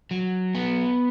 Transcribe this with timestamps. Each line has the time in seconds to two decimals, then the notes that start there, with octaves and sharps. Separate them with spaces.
0.11 F#3
0.55 B3